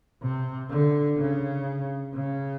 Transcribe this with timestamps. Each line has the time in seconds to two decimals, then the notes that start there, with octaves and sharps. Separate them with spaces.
0.22 C3
0.70 D3
1.17 C#3
2.13 C#3